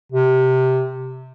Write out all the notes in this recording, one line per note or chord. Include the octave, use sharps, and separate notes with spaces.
C3